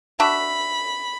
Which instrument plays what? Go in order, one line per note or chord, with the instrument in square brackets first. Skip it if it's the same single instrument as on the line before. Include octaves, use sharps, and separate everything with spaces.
[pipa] D4 F#4 E5 [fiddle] B5